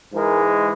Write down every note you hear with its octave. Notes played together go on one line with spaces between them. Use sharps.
G#2 E3 G#3 A#4